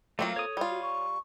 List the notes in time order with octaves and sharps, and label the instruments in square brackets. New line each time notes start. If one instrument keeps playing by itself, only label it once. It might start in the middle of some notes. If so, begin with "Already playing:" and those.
[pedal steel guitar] F#3 A3 [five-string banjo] A#3 C4 F4
[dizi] A4 [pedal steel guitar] C#5 D#6
[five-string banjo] G3 F4
[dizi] F#4
C#6